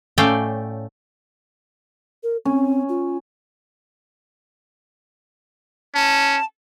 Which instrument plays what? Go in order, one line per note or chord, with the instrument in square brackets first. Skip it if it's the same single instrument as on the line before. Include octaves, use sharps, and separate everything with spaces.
[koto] A2 A3 C#4 D5 F5 G5
[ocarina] A#4
[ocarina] C4 [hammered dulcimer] C#4
[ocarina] F4
[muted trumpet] C#4 [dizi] A5